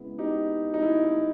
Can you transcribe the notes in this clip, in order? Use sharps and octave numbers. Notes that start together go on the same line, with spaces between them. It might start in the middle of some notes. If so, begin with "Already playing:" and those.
Already playing: C#3 G#3 B3 E4
D#4 G4
D#4
E4
D#4